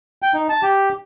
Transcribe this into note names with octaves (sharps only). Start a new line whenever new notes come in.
G5
D#4
A5
G4